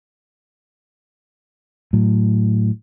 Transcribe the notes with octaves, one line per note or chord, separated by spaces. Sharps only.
A2 F#3